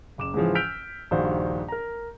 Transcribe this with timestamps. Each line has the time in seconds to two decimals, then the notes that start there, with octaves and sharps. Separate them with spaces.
0.18 F#1 D6 E7
0.34 G#2 C#3 E3 F3
0.55 E6 F6 G6 B6 D7 F7
1.11 A#1 G2 D#3 F#4 C5 F5
1.68 A#4 A#5